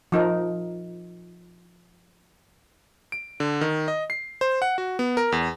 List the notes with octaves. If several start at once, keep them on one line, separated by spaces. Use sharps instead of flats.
F3 D#4 A#4
D7
D3
D#3
D#5
C7
C5
F#5
F#4
B3
A#4
E2